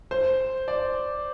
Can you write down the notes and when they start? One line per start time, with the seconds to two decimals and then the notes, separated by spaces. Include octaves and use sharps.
0.11 C5
0.68 D5